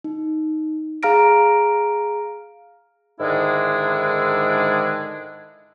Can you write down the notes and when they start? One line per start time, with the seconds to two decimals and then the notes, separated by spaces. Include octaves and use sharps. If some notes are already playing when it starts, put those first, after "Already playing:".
0.04 D#4
1.03 G#4 F5 A#5 F6 A#6 D7
3.20 G#2 D3 D#3 G#3 D4 E4